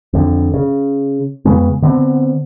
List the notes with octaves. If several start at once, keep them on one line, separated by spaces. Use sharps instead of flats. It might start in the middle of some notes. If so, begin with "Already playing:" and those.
F2 D3
C#3
F2 C#3 G#3 B3
D3 B3 C4